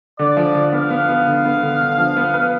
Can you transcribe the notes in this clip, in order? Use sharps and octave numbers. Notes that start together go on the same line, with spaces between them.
D3 D5
F3
D3
B3 F5
B3
B3
D3
B3
D3
D3
F3
B3
B4